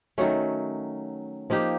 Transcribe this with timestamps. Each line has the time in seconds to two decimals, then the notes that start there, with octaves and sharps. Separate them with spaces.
0.18 D#3 F#3 A3 C#4
1.50 F3 A#3 D#4 G4